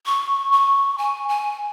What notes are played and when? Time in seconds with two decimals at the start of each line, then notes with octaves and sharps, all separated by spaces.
0.06 C#6
0.52 C#6
0.98 G#5
1.29 G#5